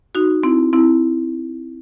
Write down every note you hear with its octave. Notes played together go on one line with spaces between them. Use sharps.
D#4 F#4
C4 E4
C4 E4